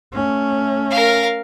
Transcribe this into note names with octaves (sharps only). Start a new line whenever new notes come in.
A3 C#4
A#4 F5